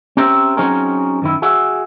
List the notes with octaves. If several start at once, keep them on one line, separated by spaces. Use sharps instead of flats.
C4 C#4 G4 A#4 C5 E5
F#3 C4 C#4 D#4 G#4 A#4
F#2 D#3 E4
F#4 G#4 E5